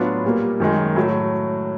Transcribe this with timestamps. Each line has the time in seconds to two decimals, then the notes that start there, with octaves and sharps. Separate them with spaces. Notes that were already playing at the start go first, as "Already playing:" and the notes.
Already playing: A2 F#3 B3 D4 F4
0.24 A#2 G3 A#3
0.60 F#2 D#3 G#3
0.96 A2 F#3